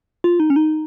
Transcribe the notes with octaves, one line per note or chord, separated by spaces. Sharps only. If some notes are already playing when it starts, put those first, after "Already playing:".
F4
D#4
C#4
D#4